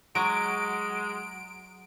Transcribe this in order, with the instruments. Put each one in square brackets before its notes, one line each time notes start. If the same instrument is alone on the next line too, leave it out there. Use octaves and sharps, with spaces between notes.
[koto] F#3 [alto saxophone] G#3 [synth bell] D7